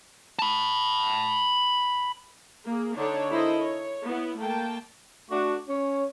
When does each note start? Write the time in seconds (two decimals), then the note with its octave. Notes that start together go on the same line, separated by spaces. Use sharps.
0.39 A5 B5
2.65 A#3 G#4
2.96 D3 D4 D#4 C#5
3.31 E4 A4 A#4 C5 D#5
3.61 C#5
4.06 B3 E4
4.40 A3 A#3 G5 A5
5.30 A3 D4 F#4
5.68 C#4 C#5